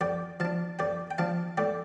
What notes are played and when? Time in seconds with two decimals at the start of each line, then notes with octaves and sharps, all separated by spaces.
0.01 F2 D5 G5
0.40 F3 D4 F5 A5
0.79 F2 D5 G5
1.11 G5
1.18 F3 D4 F5 A5
1.57 A2 D5 G5